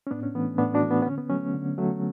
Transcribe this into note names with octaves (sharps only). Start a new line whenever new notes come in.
C#4
A2 B3 D4
C#4
E3 A3 B3
A2 B3 D4
D4 F#4
E3 A3
B3
B3
D3 C#4
B3
F#3 A3 C#4
D3
F#3 A3